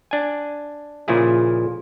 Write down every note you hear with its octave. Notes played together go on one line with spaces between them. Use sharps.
D4 G#5
A#2 C#3 F3 E4 G#4